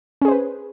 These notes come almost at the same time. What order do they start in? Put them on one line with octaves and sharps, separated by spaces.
C#4 G#4 C5 B4